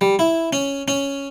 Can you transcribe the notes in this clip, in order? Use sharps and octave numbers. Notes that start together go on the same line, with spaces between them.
G3
E4
C#4
C#4